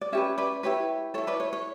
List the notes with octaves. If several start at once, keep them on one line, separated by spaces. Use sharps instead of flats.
D5
C#4 G4 B4 C#5 E5
B4 D5
E4 G4 B4 C#5
E4 A4 C#5
B4 D5
C#5
C#5